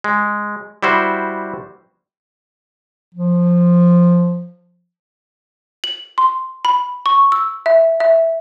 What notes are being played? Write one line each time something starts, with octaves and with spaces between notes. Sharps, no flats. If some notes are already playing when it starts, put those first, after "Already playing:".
G#3
G3 E4 F#4 C5
F3
F#7
C6
B5
C#6
E6
E5
E5